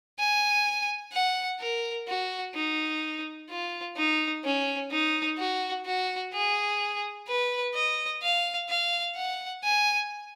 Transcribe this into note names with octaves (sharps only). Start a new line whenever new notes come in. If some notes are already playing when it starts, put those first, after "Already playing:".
G#5
F#5
A#4
F#4
D#4
F4
D#4
C#4
D#4
F#4
F#4
G#4
B4
D#5
F5
F5
F#5
G#5